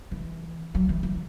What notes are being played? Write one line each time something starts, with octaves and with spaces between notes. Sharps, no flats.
E3
F#3
E3
E3